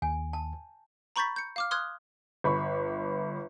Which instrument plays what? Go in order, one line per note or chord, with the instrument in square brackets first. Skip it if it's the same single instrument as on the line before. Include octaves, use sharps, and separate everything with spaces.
[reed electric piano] D#2 [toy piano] G#5
[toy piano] A5
[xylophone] A#5 B5 C#6 G6 A6 B6
G6 C#7
F5 D6 F6
C6 D#6 F6 F#6 G#6
[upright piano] G1 B5 C#6